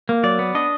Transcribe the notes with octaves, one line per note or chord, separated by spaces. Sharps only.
A#3
F#3 D5
B3
D4 D#5